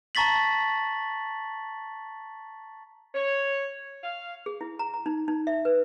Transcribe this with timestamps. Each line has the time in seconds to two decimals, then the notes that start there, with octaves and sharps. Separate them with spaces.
0.15 A5 A#5 C#6 A6 B6 F#7
3.14 C#5
4.03 F5
4.46 G#4
4.61 E4
4.79 A#5
4.94 A#5
5.06 D#4
5.28 D#4
5.47 E5
5.65 B4